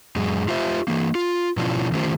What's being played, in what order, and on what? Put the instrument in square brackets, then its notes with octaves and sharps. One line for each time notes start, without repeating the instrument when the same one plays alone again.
[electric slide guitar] F#2 G#3
F4 G4 C5 E5
E3 A#3
F4
B2 F3 C#4 D4 E4 F4
D#3 A3 C#4 F4 G4 C5